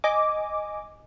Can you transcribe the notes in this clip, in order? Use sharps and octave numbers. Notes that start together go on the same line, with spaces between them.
D#5 G#5 D6